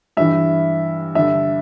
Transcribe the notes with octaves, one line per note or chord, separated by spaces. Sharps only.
G2 E3 E5
G2 D3 E5